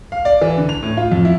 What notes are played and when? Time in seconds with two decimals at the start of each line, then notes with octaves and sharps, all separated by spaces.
0.12 F5
0.25 D5
0.42 E3
0.58 D3
0.69 F7
0.83 A2
0.97 F4
1.12 F2
1.25 E4